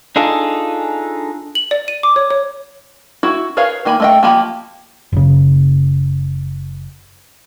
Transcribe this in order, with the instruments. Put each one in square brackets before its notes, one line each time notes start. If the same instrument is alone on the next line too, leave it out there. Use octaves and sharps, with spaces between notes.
[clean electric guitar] D4 D#4 F4 G#4 A4
[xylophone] F#7
D5
D#7
D6
C#5
C#5
[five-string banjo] E4 F#4
G#4 A#4 B4 C#5 F5
D#3 A#3 G#5 A#5 B5
A3 D#5 G5
F3 A#3 G4 G#5 B5
[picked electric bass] F#1 C#3